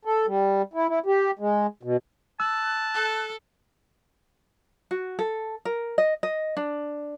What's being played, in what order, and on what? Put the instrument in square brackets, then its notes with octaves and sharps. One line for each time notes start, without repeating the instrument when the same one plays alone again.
[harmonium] A4
G3
E4
E4
G4
G#3
B2
[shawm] A5 [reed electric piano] E6 [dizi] F#6
[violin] A4
[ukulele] F#4
A4
A#4
D#5
D#5
D4